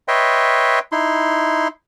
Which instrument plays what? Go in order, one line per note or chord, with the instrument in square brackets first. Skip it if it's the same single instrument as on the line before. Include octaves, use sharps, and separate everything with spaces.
[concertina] B4 C#5 D#5 E5 G5 C6
D#4 E4 C6